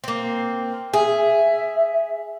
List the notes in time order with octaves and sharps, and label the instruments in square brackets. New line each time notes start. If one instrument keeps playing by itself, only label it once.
[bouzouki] A#3 C4
[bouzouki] G#4 [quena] E5